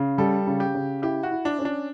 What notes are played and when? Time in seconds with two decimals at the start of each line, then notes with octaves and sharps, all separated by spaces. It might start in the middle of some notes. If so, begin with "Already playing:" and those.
Already playing: C#3
0.18 G3 A4
0.47 C#3
0.60 G4
0.75 C#3
1.02 E4 G4
1.23 F#4
1.31 E4
1.45 D4
1.59 C#4
1.65 D4